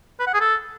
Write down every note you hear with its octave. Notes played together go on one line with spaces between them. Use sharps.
B4
F#5
G#4
A4